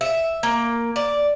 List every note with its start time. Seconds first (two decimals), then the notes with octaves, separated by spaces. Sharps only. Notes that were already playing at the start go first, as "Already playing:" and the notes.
0.01 E5
0.43 A#3
0.96 D5